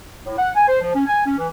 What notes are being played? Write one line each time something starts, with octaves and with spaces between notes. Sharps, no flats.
A2
F#5
G#5
C5
F3
C#4
G#5
C#4
E3